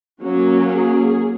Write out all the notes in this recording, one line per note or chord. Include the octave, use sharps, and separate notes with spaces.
F#3 A#3 C#4 F#4
G#4